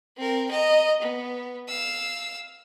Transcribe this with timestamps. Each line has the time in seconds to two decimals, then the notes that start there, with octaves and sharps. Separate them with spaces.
0.17 C4 A#4
0.51 D#5 A#5
1.02 B3
1.69 F5 E6